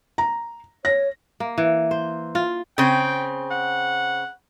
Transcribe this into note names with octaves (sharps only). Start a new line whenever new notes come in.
A#5
C#5 A#6
A#3
E3
C5
F4
C#3 C4 G5
F#5